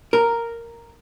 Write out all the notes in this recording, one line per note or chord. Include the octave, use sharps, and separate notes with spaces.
A#4